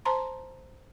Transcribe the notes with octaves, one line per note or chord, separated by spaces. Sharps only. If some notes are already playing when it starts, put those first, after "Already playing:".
C5 A5 A#5 C6